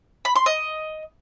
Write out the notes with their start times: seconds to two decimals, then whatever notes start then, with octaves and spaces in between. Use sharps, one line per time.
0.25 B5
0.36 C6
0.46 D#5